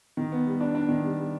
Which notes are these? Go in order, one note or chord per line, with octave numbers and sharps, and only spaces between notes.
D#3
B3
G3
D4
D4
D#3
G3
G3